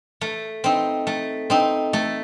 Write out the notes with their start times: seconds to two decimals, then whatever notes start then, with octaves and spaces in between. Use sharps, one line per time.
0.21 A3
0.64 C4 D#4
1.07 A3
1.50 C4 D#4
1.93 A3